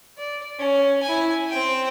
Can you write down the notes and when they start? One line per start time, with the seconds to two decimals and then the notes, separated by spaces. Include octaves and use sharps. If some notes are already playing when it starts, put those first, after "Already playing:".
0.18 D5
0.59 C#4
1.03 E4 G#5
1.49 C4 G5